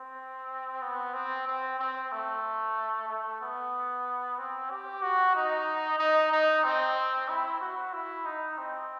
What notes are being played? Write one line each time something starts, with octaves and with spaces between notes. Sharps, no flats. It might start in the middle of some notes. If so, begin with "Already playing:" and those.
Already playing: C4
B3
C4
C4
C4
A3
A3
B3
C4
G4
F#4
D#4
D#4
D#4
C4
E4
F#4
E4
D#4
C4